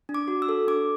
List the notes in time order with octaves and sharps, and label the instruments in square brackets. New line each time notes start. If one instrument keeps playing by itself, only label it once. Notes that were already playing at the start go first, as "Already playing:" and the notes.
[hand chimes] D4
D6
F#4
E6
A4
D4 D6